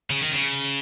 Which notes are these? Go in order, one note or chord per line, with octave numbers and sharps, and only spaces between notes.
C#3
D#3
C#3